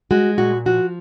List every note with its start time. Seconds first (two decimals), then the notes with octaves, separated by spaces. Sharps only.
0.11 G#3 F#4
0.38 A#2 F#4
0.66 F3 F#4